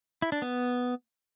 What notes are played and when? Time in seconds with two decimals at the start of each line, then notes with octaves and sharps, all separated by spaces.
0.22 E4
0.32 D4
0.42 B3